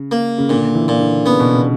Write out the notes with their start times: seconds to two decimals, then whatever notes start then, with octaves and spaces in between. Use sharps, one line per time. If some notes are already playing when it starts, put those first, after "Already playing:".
Already playing: C#3
0.11 A#3
0.38 C#3
0.49 A#2 D3
0.74 E3
0.88 A#2
1.00 D3
1.25 C#3 B3
1.39 B2
1.53 C#3